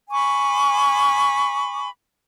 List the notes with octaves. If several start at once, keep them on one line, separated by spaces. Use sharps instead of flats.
G#5 B5 C#6 D6